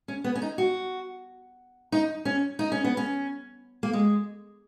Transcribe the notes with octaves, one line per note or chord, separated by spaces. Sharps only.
C#4
B3
C#4
D#4
F#4
D#4
C#4
D#4
C#4
B3
C#4
A#3
G#3